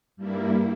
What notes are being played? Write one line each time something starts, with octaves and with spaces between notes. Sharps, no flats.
G2 G3 A#3 E4